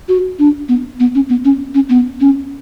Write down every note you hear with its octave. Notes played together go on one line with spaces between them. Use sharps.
F#4
D4
B3
B3
C#4
B3
C#4
C#4
B3
C#4